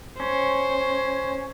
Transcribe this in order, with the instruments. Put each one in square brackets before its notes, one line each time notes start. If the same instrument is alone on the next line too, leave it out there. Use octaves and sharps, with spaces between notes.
[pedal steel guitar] C#4 [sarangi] C5